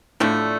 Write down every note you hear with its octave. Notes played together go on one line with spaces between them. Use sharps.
A2 D3 F3 A3 D4